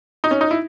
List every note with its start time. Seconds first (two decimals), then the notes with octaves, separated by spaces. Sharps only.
0.24 D#4
0.31 C#4
0.41 D#4
0.51 E4